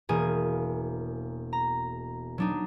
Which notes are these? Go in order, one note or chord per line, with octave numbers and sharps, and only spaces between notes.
E1 A#3 G#4 G#5
A#5
F#3 D4 D#4